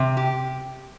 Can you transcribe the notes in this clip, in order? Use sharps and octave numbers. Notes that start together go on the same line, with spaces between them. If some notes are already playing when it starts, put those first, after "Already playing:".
Already playing: C3
G4